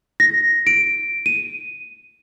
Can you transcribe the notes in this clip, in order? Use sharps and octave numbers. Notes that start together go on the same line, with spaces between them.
A#6
D7
D#7